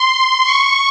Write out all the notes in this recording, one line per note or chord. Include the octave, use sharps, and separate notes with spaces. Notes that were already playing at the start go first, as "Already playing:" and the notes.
Already playing: C6
C#6